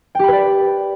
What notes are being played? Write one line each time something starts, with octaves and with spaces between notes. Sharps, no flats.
G4 B4 D5 G5 B5